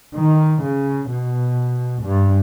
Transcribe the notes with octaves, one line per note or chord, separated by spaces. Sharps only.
D#3
C#3
B2
G2